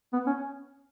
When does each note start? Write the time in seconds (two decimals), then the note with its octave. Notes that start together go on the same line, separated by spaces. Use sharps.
0.13 B3
0.27 C#4